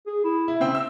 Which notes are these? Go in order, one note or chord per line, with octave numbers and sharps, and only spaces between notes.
G#4
E4
E4
C#3 C4 E5 G5
E6